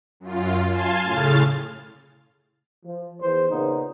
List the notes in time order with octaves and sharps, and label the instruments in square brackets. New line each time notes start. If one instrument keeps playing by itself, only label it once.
[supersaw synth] F#2 F4
F5 G#5 A5 C6
A2 C#3 F6 A6
[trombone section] F3
E2 C5
A#2 C#3 B3 D#4